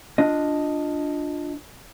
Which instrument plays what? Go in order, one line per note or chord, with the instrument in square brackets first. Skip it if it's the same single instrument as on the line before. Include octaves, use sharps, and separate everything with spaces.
[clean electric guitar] D4 F4 D#5